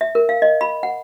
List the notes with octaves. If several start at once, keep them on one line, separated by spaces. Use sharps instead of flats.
E5
A#4
F5
D#5
B5
F#5